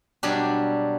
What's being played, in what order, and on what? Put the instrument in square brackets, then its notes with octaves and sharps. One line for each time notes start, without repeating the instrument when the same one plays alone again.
[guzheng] B2 F#3 G3 D4